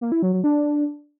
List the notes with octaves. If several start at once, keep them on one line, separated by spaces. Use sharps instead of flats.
A#3
E4
F#3
F#3
D4